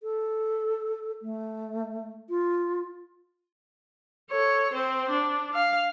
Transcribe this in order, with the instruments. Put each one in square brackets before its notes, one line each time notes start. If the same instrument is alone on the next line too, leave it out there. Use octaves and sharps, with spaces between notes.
[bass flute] A4
A3
F4
[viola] A4 C#5
C4 C5
D4
F5